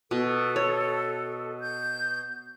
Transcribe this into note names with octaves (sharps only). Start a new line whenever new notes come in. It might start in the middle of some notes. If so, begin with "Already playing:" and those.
B2 A4
C#5
G6